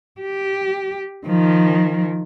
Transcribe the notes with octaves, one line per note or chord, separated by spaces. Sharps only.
G4
D#3 F3